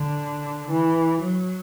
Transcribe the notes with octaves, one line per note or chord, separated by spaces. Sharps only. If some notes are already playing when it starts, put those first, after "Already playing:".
Already playing: D3
E3
F#3